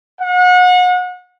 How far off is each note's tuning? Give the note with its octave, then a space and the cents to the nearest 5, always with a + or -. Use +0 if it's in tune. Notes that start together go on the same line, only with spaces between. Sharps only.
F#5 -35